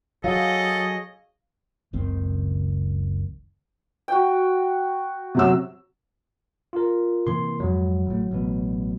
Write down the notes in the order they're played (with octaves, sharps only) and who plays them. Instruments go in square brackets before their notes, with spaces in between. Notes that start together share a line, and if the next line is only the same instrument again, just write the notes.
[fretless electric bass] F#3 [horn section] G#4 C#5 D#5 [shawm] A4 [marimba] F5
[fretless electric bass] F#1 C#2 D#3 C4
[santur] F#4 G5
[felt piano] C3 F#3 E6
[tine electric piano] F4 A#4
[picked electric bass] C3 E3 A#3 [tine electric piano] C6
[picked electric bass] F2 G#2 [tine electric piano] F#3
[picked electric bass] G#1 A2
A1 B2